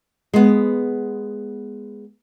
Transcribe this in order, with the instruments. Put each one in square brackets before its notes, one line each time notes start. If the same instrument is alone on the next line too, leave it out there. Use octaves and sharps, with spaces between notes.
[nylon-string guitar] G#3 B3